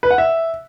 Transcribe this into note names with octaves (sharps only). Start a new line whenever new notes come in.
B4
F#5
E5